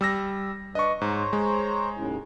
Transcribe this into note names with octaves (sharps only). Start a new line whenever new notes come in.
G3 E6 A#6
D4 B4 D5 D#5 C#6
G#2 C5 C#5 A#5
G#3
D#2 A2 C#3